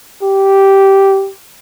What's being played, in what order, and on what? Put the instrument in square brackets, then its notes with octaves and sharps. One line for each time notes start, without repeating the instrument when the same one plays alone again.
[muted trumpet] G4